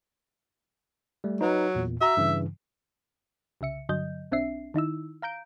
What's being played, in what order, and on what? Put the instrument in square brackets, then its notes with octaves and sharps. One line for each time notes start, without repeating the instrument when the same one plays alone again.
[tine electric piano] G3 A3
[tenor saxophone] F#3 [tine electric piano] D#4 B4
[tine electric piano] E2 A#2
[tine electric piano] F#4 A#5 [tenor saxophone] E5
[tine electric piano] G2 C#3 E3
[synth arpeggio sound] C2 C#3 E5 C#7
G2 D3 F#3 D#5 G6
B1 C4 D4 E5 C7
D#3 D#4 E4 E6
F5 A#5 G6 D7